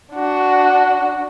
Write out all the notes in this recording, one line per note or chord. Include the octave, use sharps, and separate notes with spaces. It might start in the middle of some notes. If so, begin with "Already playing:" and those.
D4 F#4